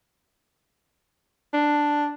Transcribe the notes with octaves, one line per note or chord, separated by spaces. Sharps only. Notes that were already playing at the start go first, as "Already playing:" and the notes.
D4